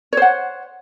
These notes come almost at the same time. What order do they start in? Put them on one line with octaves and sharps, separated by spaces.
C#5 C5 F#5